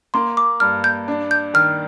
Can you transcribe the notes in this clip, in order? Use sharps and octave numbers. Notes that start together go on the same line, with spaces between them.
A#3 C6
D6
G2 F6
G6
D4
G6
D#3 F6